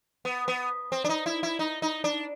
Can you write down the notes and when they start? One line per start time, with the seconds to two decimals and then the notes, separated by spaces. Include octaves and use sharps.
0.25 B3
0.48 B3
0.92 C4
1.04 D4
1.09 D#4
1.26 E4
1.43 E4
1.59 D#4
1.82 D#4
2.04 D4